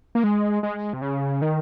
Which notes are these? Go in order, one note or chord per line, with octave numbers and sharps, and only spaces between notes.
A#3
G#3
G#3
C3
C#3
D#3